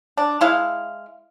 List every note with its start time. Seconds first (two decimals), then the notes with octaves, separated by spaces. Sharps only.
0.17 D4
0.41 G#3 E4 F5